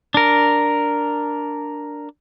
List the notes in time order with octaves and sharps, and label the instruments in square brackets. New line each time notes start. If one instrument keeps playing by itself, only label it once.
[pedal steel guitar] D4 A#4